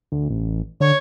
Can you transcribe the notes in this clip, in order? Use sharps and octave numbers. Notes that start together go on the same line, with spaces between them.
D2
A1
D3 C#5